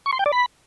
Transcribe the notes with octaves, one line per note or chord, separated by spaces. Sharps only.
C#6
C6
G5
D5
B5